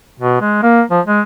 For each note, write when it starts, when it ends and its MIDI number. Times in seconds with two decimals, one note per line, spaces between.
0.20 0.39 47
0.41 0.62 56
0.63 0.81 58
0.90 1.00 53
1.06 1.21 56